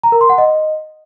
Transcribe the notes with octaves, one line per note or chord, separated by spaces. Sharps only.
A#5
A#4
C6
F#5
D#5